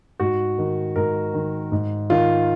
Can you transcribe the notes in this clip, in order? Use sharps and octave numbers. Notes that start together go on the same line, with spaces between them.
G#2 F#4
D#3
G#2 A#4
D#3
G#2
D#3 F4